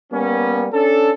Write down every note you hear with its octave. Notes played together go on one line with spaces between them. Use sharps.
G3 A#3 B3 C#4
C#4 D4 A4